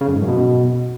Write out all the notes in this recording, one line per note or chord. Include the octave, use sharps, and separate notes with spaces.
C#3
F#2
G#2
F#2
B2